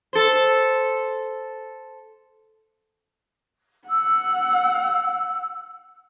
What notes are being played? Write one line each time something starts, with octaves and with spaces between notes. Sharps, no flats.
A4 C5
F#5 E6